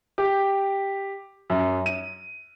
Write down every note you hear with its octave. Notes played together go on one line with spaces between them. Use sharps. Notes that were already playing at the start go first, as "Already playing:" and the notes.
G4
F#2
D#7